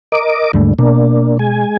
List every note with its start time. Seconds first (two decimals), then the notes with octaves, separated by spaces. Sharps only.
0.12 A#4 D#5 D6
0.53 D#2 G#2 D3 G3 A3
0.79 B2 A#3 D4
1.39 G#3 G#5